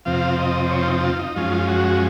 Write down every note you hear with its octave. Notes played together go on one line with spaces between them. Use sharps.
F2 C3 F3 C4 F5
D#5
D#5
C#5
F4
D#4
D#4
F4
D#4
F#2 F3 G#3 C#4 F4
F#4